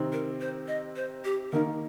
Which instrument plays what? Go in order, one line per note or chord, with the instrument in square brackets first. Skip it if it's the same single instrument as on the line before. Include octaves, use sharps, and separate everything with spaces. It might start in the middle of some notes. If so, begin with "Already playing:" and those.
Already playing: [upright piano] C3 D#3 C4 D#4
[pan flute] A#4
C5
D#5
C5
G4
[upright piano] D#3 A#3 D#4 [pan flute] A#4